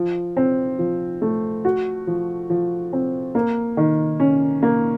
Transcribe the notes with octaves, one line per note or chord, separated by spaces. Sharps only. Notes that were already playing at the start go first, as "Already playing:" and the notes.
Already playing: F3
C4
F3
A3
F#4
F3
F3
C4
A#3
D#3
C#4
A#3